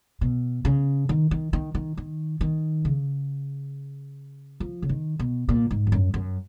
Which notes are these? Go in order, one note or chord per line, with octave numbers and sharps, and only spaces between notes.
B2
C#3
D#3
D#3
D#3
D#3
D#3
D#3
C#3
F3
C#3
D#3
B2
A#2
G#2
F2
F#2
F#2